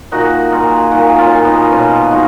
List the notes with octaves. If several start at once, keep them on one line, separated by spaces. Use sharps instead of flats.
A#2 D#4 F#4
A#2 F4 G#4
A#2 D#4 F#4
C#4 F4
A#2
B3 D#4
B2 C#4 F4
G#3 D#4 F#4